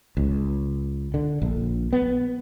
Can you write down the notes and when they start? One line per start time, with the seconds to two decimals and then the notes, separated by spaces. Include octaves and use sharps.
0.17 C#2
1.14 D3
1.42 A#1
1.93 B3